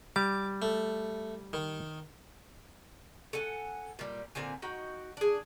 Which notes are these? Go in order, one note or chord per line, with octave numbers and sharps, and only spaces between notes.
G3 D6
A3
D#3
A4 F#5 G#5
A#2 G3
A#2 D3 C4 G#5
D#4 F#4 G5
D4 G#4